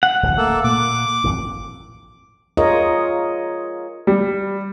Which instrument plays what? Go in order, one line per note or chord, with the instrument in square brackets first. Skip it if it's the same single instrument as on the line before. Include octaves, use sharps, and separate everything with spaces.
[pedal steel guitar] F#5
[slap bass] D1 A1
[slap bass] A3 [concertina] A#3 A4
[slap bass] A#2 [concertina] D6
[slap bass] G#1 F2 A2
[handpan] F4 G#4 A#4 C#5 D#5
[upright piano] G3